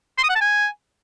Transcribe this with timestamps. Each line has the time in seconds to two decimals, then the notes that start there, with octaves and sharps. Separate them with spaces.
0.18 C6
0.24 D#6
0.30 F#5
0.35 A5
0.41 G#5